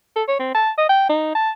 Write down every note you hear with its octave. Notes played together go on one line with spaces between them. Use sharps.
A4
C#5
C4
A5
D#5
G5
D#4
A5